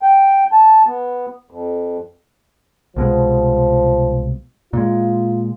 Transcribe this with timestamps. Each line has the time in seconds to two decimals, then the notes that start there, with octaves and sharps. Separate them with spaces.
0.02 G5
0.52 A5
0.86 B3
1.51 F2
2.97 C2 B2 F3 G#3
4.73 A#2 G#3 F4